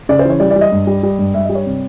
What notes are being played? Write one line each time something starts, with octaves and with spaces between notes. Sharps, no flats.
C#3 D5
C5
E3 C#5
G3 D5
D5
G3
D#5
G2
G3
G3
G2
G2 E5
G3 D#5
C#5
C3